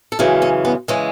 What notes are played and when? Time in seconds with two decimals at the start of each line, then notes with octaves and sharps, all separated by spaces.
0.12 A4
0.19 F#2 C#3 E3 G#3 G#4
0.42 C#4
0.65 B3
0.88 C#3 E3 G#3 C#4